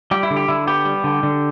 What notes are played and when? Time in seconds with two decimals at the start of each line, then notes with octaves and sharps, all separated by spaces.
0.11 G3 G4
0.23 E4
0.30 D3
0.36 G4
0.48 D3 E4
0.67 B3 G4
0.85 G3
1.04 D3
1.23 D3